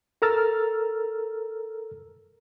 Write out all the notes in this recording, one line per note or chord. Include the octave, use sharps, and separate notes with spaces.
A4 A#4 A#5 E6 F6 A6